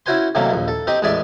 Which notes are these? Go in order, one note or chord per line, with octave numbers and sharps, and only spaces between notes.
C#4 E4 F#4 C5 G#5 C6
C3 D#3 F#3 A3 A#3 C#4
A#1 D#2
A4
C4 D#4 G4 D#5
A1 E2 G#3 G#4 D5 E5